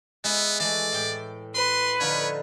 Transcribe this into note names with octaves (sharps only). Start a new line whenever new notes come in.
G#3 B3 E4
E3 G#3 A3 D5
A2 G5
B4 C6
D3 F3 D#4 C#5